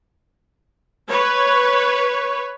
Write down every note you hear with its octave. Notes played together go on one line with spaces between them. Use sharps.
B4 C#5